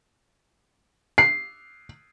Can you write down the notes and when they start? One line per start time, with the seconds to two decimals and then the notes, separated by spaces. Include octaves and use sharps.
1.18 C7